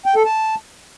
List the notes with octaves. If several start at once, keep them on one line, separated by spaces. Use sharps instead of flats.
G5
A4
A5